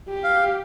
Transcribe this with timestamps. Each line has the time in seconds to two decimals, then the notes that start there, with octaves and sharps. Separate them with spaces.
0.09 G4
0.24 F5